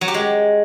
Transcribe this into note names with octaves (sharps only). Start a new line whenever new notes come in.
F#3
G4
G#3